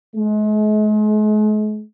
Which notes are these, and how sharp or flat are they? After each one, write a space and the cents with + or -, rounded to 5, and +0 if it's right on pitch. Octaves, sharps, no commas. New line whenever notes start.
G#3 +45